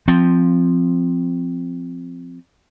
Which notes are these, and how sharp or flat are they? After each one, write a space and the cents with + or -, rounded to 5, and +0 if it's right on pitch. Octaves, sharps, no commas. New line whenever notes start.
F3 +0 C4 -5